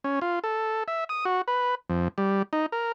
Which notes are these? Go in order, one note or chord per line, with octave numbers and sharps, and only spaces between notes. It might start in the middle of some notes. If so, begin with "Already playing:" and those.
C#4
F4
A4
E5
D#6
F#4
B4
F2
G3
D#4
A#4